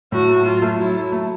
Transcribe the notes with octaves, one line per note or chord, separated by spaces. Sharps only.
A2 F#4
A3
F#3 F4
A3
F#3 E4
F#3
A3